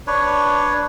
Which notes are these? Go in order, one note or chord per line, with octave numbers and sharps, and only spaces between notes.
D4 B4 C#5